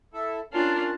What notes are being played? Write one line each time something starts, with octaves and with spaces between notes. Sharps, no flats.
E4 A4 E5
C#4 D4 F4 A#4 A5